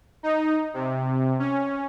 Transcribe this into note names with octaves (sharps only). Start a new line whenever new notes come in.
D#4
C3
C#4